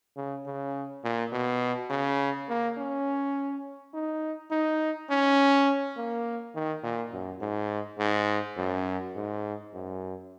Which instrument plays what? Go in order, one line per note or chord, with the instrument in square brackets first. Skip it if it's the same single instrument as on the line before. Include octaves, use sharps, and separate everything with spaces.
[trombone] C#3
C#3
A#2
B2
C#3
A#3
C#4
D#4
D#4
C#4
A#3
D#3
A#2
F#2
G#2
G#2
F#2
G#2
F#2